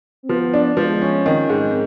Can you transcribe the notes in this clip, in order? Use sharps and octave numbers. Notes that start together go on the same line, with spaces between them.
C4
F3 B3
D4
F3 G#3
C#4
D#3 C4
G#2